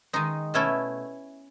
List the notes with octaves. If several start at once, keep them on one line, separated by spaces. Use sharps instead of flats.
D#3 G#3 D#4
B2 A3 C#4 E4 A4